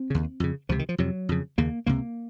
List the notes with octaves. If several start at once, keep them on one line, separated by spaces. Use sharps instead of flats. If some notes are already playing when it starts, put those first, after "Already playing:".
Already playing: C4
D#2 C#3
F2 C#3
C#2 C3 F3
D#3
F3
F2 C3 F#3
F2 C#3
D#2 C#3 A#3
C#2 C3 A#3